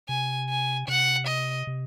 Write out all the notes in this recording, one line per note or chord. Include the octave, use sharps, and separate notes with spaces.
C3 G#5
G#5
C3 F#5
D#5
C3